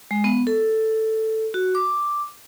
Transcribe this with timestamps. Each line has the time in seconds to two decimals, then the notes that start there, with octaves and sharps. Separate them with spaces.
0.11 G#3
0.24 B3
0.47 A4
1.54 F#4
1.75 D6